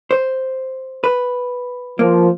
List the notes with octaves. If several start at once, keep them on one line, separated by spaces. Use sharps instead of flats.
C5
B4
F3 A#3